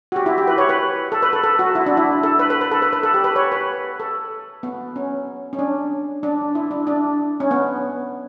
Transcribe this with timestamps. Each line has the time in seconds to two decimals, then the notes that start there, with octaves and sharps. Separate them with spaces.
0.12 F#4
0.16 G4
0.26 E4
0.38 G4
0.47 B4
0.58 C#5
0.69 B4
1.12 A4
1.23 B4
1.33 A4
1.44 A4
1.59 F#4
1.75 E4
1.86 D4
1.97 E4
2.23 A4
2.39 B4
2.50 B4
2.61 B4
2.71 A4
2.82 B4
2.93 B4
3.03 A4
3.14 G4
3.24 B4
3.36 C#5
3.52 B4
4.00 A4
4.63 B3
4.96 C#4
5.53 C#4
5.59 D4
6.23 D4
6.55 E4
6.71 D4
6.87 D4
7.40 C#4
7.51 B3